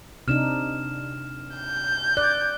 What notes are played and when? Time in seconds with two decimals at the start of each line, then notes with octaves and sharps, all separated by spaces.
0.28 C3 D4 D#4 F6 E7
1.56 G6
2.17 D5 F#6